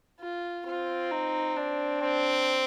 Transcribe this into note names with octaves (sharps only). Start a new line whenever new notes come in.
F4
C4 F4
D#4
D4
C4